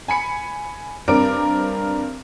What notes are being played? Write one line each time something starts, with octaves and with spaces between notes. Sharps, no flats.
G#5 B5 C#7
G2 C4 A#4 D5 D6 D7